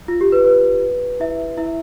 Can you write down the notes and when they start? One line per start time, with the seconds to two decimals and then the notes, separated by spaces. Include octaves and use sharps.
0.08 F4
0.21 G4
0.32 B4
0.45 B4
1.20 E4 E5
1.57 E4 E5